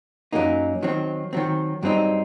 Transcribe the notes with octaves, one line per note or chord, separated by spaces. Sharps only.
F#2 F#3 A#3 D#4
D#3 F#3 C4
D#3 F#3 C4
G2 F#3 C4 D#4